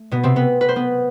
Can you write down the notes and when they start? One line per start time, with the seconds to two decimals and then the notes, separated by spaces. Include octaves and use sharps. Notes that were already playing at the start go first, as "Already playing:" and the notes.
Already playing: A3
0.11 B2 B3
0.23 C3 C4
0.36 B3 B4
0.61 B4
0.69 C5
0.76 B3 B4